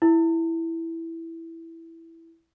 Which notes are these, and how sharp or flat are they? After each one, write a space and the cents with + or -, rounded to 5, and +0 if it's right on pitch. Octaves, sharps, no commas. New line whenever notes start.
E4 +0